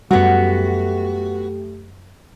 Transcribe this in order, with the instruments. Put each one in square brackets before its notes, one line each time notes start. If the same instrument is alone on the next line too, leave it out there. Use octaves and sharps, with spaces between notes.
[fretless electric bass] F#2 G3 [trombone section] A3 G4 [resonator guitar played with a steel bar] B3 F#4